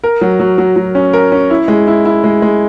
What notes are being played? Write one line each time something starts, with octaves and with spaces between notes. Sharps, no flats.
A#4
F#3
F#3
F#3
F#3
C#4
A#4
C#4
E4
G#3
E4
E4
G#3
G#3